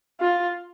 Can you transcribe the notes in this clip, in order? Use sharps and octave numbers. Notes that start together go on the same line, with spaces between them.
F4